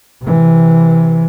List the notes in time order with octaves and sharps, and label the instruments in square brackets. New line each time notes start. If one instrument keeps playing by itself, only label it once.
[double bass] C3 E3